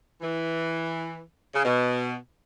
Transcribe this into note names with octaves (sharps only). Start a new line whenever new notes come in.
E3
C#3
B2